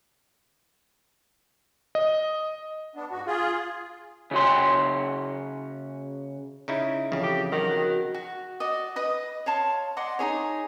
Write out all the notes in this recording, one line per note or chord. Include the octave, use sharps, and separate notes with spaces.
D#5
B3 D4
G#2 F#4
F4 G#4
C#3 F#4 C6
C#3 D#4 E4 D7
F2 C#3 E3
G4
D#3 F#3
F#4
F#4
F#4 D5 D#5
B4 D#5 D#6
C#5 F5 A5 C6
D5 D#5 F#5 C6
D#4 E4 G#4 C#5